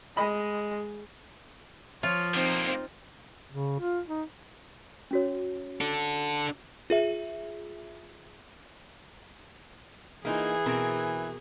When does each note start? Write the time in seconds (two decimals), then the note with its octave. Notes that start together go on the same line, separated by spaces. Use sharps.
0.17 G#3 D#5 B5
2.03 F3 F4 C#5
2.34 D3 A#3 C4 D#4
3.52 C#3
3.80 F4
4.08 D#4
5.11 C#4 F#4 C#5
5.81 D4 A4
6.90 F4 G#4 E5
10.25 E3 A#3 D#4 F4 G#4
10.66 B2 C4 A#4